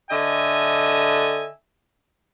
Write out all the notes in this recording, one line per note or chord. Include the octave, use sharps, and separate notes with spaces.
D3 A4 D#5 E5 G#5